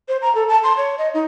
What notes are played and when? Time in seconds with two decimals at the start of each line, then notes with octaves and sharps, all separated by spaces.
0.08 C5
0.22 A#5
0.35 A4
0.48 A5
0.64 C6
0.77 C#5
0.98 D#5
1.14 D#4